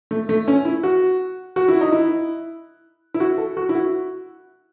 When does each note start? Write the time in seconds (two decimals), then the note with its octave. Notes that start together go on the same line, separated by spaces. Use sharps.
0.11 A3
0.29 A3
0.48 C#4
0.65 E4
0.83 F#4
1.56 F#4
1.68 E4
1.81 D#4
1.93 E4
3.14 E4
3.20 F#4
3.38 A4
3.57 F#4
3.69 E4
3.75 F#4